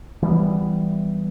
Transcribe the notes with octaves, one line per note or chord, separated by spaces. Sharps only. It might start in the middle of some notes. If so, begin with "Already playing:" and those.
E3 G3 A3 B3